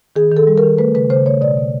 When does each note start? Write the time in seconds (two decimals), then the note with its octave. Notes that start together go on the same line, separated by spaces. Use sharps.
0.16 D#3 G#4
0.31 D#3
0.37 A4
0.47 G3
0.58 A#4
0.63 D#3
0.78 A3 B4
0.95 C#3 B4
1.10 C#3 C5
1.26 A3 C#5
1.41 B2 D5
1.57 B2